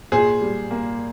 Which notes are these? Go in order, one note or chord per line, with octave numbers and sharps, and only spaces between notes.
A#2 G#4 C5
G3
A#3